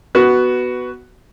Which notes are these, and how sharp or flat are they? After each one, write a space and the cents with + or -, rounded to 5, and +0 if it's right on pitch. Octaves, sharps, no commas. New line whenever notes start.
B3 +0 F#4 +10